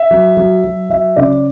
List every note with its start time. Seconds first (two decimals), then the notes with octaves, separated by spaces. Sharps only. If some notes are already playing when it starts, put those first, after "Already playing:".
Already playing: E5
0.11 F#3
0.37 F#3
0.64 F#3
0.90 F#3 E5
1.16 C#3 D5